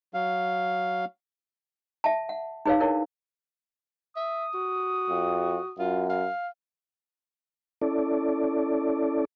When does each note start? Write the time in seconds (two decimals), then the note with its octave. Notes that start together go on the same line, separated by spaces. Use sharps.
0.14 F#3 F5
2.04 E5 A5
2.29 F#5
2.66 D#4 G#4 B4 C#5 D5 F5
2.80 D4 E4 A#4 B4 C#5 D5
4.16 E5 D#6
4.54 F#4
5.09 F2
5.79 F#2 F4
6.10 F5
7.82 C#4 E4 A4 D5